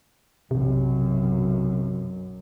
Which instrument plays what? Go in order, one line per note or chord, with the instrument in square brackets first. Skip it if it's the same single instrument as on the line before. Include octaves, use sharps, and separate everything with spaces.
[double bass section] B1 F#2 [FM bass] C3